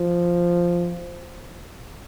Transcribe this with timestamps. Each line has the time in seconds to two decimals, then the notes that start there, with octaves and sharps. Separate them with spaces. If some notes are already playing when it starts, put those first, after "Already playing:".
Already playing: F3